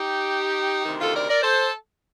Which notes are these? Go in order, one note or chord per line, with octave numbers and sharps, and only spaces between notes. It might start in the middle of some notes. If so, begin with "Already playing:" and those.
Already playing: D#4 G4
D2 C3 D#3
F4 A4
A#4 D5
A#4 D5
A4 C5